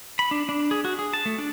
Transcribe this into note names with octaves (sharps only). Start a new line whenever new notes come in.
B5
D4
D4
G#4
F#4
G#4
A5
A3
D4